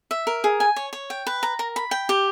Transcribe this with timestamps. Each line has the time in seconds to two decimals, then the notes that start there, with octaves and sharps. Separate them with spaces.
0.11 E5
0.27 A#4
0.44 G#4
0.60 G#5
0.76 C#5
0.93 C#5
1.10 G5
1.27 B4
1.43 A#5
1.59 A#4
1.76 B5
1.91 G5
2.09 G4